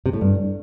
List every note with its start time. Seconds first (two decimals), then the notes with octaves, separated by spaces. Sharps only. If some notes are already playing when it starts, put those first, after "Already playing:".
0.06 C3
0.13 A2
0.21 G2